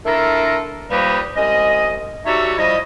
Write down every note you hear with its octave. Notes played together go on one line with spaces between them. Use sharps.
A3 D4 E4 F4 A4 A#4
F3 G3 A#3 D#4 G4 B4
C2 G#3 C#4 D#5
G3 D#4 F#4 A4 C#5 E5
F3 G3 E4 D#5